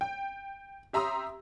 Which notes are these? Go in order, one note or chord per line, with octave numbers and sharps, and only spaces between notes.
G5
G4 E5 A#5 C6 D#6 E6